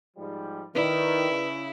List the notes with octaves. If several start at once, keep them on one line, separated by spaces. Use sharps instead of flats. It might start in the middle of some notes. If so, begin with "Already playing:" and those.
G#2 F3 G3
D#3 E4 B4 D5
C#3